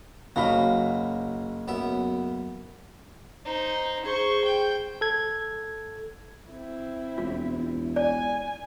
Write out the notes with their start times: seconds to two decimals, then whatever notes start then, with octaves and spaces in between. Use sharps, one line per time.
0.36 F#1 F#3 D#4 F#4 F5 B5
1.68 F#2 B3 E5
3.45 D#4 C5
4.05 G#4 C5 C#6
4.45 G5
5.01 A4 G#6
6.50 C4 E4
7.18 E1 F4
7.96 D5 G#5